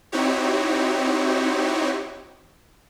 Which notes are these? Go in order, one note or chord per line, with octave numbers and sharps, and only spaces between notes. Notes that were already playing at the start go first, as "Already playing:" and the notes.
C4 D#4 E4 F#4 G4 C#5